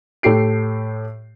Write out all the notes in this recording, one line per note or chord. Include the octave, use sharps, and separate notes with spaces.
A2 A3 G4 C7 D7